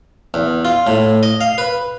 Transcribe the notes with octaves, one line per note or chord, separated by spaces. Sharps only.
E2
F4
A2
D#5
F5
B4